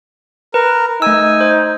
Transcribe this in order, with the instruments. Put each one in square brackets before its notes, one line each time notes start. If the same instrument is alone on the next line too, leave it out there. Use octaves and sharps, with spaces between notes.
[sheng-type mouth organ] A#4 [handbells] B4
[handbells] A3 E6 [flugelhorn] D#4 [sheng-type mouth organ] G#5
[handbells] C5